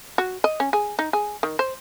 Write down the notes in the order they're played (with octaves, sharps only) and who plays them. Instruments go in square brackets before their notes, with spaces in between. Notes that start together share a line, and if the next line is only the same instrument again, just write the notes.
[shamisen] F#4
D#5
C#4
G#4
D#4
G#4
D#3
C5